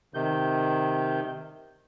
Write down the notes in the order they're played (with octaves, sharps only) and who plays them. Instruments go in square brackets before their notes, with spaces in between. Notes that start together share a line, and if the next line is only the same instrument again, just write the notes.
[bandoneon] C3 D#3 G6